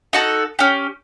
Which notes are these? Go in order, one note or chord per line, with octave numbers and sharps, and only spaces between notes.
D#4 F#4 A4
C#4 G4